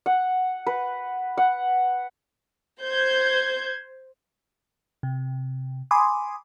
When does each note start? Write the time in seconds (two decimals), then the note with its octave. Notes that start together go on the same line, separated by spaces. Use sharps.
0.06 F#5
0.67 B4
1.37 F#5
2.81 C5 G6 G#6
5.03 C3
5.91 G#5 B5 C6 D6 D#6